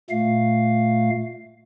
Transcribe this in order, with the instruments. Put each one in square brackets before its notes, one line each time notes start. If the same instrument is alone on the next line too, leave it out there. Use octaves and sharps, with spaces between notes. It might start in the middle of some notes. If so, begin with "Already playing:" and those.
[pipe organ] A#2 A3 F5